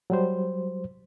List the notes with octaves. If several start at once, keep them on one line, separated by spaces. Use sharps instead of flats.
F#3 G3 C5